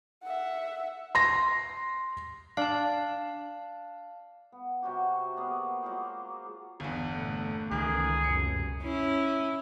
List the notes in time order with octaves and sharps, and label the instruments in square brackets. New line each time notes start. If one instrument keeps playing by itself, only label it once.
[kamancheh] E5 F#5
[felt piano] C6 A#6
[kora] D4 [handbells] F5 A5
[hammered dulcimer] B3
C3 F#3 F#4 G4
A#3 B3 G#4 D5
F#3 G#3 F4 C5
[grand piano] G1 E2
[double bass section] A#2 A3
[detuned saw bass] C#2 [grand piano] D#3 E3 [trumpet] G#4
[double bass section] F1 F#2 B2 [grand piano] C#7
[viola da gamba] C#4 E4